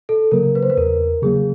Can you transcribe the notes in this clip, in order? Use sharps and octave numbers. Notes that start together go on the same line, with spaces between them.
A4
C#3 F#3 A#3 A#4
B4
C5
B4
E2 A#4
C#3 F#3 A#3 G#4